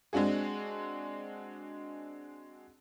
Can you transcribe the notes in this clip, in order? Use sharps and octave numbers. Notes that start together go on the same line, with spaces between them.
G#3 C4 D4 F#4 G#4